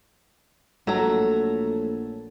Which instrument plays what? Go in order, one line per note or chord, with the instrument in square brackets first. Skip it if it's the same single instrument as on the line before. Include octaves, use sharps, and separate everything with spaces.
[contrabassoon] A#1 [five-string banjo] F#3 A#5 [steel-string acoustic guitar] A3 [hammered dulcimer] A4 G#5